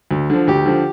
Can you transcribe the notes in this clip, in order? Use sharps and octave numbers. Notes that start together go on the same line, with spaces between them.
D2
D3 F3
D2 G4
D3 F3